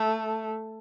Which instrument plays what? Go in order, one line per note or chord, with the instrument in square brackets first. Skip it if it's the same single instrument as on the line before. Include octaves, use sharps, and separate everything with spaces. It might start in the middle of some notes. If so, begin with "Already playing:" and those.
Already playing: [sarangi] A3